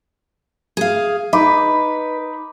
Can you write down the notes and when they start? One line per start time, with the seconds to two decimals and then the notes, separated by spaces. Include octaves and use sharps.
0.77 G#4 F5
1.33 D#4 B4 B5 D6